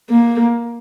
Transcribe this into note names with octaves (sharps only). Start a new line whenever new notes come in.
A#3